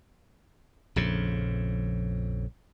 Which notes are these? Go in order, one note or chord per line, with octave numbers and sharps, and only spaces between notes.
A#1 F2 C#3